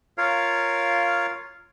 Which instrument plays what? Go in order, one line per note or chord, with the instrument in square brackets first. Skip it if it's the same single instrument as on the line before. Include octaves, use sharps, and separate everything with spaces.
[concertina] F4 A#4 C#5 F5